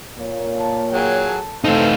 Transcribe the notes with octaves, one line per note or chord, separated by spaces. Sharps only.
A#2 A#3 C#5
A5
F#3 G#4 G5
A4
E3 A3 C4 D#4 A4 F5